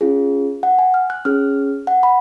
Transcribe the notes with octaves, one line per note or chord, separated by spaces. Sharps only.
C#4 F4 G#4
F#5
G#5
F6
F#6
C#4 G#4 F6
F#5
B5